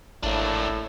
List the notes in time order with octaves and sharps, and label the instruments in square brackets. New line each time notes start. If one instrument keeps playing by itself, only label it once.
[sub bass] G#1 [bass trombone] A2 [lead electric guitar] A#3 D4